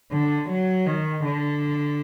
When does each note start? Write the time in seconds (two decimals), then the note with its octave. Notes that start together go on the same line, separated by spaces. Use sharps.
0.12 D3
0.50 F#3
0.86 D#3
1.25 D3